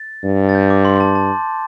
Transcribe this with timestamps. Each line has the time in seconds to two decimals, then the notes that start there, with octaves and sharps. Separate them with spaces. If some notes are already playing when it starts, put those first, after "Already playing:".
Already playing: A6
0.24 G2
0.49 A6
0.55 G6
0.70 D6
0.85 C6
0.95 C6
1.00 A5
1.15 A5